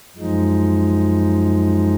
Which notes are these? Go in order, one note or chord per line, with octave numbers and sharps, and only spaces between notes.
F#2 F3 G#3 D#4